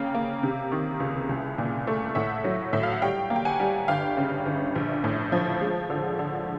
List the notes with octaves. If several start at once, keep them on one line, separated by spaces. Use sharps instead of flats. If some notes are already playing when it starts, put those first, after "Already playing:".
Already playing: C#3 A#3 F5 G5
A#3
C3
D#3
C#2
C2
A#2
A3
A2 E5 F#5
F#3
A2 E5
F5
F#5
G3 F5 G5
A#3
G5
F#5 G#5
G3
G1 F5 G5
C#3
G1
A#1
A2
F3
G#3
D3
D3